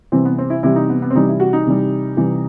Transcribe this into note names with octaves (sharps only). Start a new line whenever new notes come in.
C3 E3 G3 C4
B3
C4
E4
C3 E3 G3 E4
D#4
B3
B3
C4
C3 E3 G3 D#4
E4
F#4
D#4
C3 E3 G3
C3 E3 G3